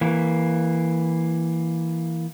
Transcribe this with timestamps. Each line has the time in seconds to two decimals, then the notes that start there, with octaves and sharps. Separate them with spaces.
0.01 E3 A#3